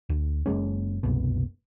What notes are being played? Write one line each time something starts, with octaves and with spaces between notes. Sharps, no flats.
D2
F#1 F2 G#3 C#4
F#1 C2 B2